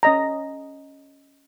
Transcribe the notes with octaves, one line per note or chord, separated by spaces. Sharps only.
C#4 D#5 A#5